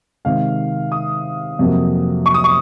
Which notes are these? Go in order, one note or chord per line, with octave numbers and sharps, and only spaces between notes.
C3 D#3 G#3 F5
D#6
F2 C3 F#3 A#3
C#6
D#6
C#6